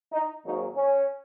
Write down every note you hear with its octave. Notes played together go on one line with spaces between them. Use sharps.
D#4
G#1 G#2 F#3 A#3 D#4
C#4